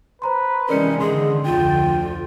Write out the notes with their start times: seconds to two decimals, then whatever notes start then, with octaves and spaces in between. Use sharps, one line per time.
0.22 B4 C5 A#5 C6
0.69 C3 E3 G#3 C#4 D#4 A#4 D5 C#7
1.00 D3 D#3 G#4 D#5 C6
1.45 F1 D2 D3 F4 G5